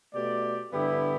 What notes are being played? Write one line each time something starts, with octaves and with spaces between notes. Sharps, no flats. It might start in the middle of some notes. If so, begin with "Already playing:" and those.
B2 A3 G4 D5
G2 D3 B3 E4 G4